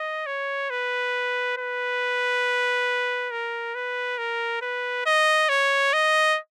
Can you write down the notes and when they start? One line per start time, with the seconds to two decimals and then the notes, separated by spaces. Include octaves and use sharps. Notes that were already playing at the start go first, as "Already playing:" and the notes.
Already playing: D#5
0.26 C#5
0.70 B4
1.57 B4
3.31 A#4
3.75 B4
4.18 A#4
4.61 B4
5.06 D#5
5.49 C#5
5.93 D#5